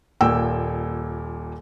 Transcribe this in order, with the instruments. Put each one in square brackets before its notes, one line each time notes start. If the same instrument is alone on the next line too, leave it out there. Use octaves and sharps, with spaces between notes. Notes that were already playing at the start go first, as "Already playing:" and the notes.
[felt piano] D#1 A#2 G5 E6